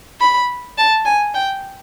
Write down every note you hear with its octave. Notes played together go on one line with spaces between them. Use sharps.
B5
A5
G#5
G5